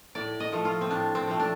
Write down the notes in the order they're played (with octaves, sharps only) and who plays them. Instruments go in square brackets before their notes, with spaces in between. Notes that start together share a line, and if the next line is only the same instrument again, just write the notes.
[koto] A2 D5
D#5
F3 A3
F4
C4
A2 D4
C4
F3 A3
D4